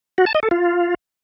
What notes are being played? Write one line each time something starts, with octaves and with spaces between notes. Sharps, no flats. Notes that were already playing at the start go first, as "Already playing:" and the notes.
F#4
A5
D#5
A4
F4